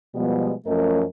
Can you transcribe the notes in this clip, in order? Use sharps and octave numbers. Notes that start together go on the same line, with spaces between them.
B2 F3 G3 G#3 B3
F#2 F3 A3 C#4 A#4 D#5